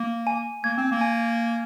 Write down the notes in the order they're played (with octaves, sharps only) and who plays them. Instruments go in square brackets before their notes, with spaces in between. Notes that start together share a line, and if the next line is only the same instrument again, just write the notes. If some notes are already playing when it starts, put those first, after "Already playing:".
Already playing: [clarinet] A#3
[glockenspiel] G#5
[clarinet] A#3 [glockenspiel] G#6
[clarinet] C4
A#3
[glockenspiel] G#5